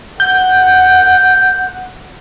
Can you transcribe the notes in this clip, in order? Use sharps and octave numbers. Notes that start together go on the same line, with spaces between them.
F#5 G6